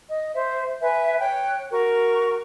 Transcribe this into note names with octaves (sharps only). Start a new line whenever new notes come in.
D#5
C5 E5
B4 E5 G#5
C#5 G5 F#6
F#4 A#4 C#6